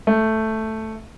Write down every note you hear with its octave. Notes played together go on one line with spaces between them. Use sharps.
A3